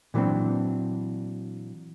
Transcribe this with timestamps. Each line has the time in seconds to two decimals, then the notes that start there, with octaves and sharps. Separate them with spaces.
0.14 A#2 E3 F#3 B3 C4 D4